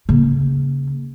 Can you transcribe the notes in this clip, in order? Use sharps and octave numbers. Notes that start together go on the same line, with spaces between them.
C#3 A#3